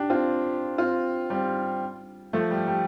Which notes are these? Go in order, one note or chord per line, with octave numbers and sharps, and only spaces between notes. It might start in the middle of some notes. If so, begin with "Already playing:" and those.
Already playing: D4 G4
C4 F4
C4 F4
G3 C4
F3 A3
G3
G3